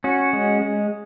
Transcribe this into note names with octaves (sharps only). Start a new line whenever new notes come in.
C#4 F#4
G#3
G#3